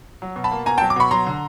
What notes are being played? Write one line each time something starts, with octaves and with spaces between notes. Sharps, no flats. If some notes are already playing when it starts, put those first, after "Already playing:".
F#3
B2
A5 B5
A#3
B2 G#5 A#5
G5 A5
F#3
D6
B2 B5 C#6
F#3 A#5 C6
D3